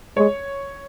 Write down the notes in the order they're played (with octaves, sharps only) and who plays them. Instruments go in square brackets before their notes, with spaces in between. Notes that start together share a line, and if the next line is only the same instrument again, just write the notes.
[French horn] G#3 [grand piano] C#5